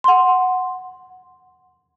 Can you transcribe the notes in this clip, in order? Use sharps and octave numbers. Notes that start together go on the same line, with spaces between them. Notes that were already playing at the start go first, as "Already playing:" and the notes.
F#5 C6